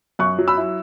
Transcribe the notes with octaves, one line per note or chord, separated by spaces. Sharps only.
F#2 C#6 F#6
F#3
B5 E6
E4